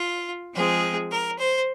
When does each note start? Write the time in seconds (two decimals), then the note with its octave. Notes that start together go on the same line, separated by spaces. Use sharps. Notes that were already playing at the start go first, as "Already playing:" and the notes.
Already playing: F4
0.54 F3 G#3 C4 G#4
1.11 A#4
1.38 C5